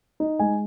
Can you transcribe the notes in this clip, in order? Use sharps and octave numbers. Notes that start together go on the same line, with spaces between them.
D#4
G#3 G#5